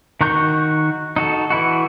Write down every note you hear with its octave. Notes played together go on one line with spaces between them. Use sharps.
D#3 F#4 A#5 C#6 G6
D#4 F#4 A4
E3 E4 F#4